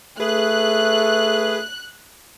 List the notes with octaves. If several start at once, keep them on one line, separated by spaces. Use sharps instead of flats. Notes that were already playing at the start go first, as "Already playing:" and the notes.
A3 G#4 B4 F#6